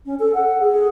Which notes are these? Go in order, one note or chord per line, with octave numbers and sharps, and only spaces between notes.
C#4
A4
F#5
G#4